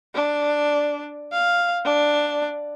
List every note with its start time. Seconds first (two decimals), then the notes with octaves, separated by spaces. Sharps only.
0.15 D4
1.32 F5
1.85 D4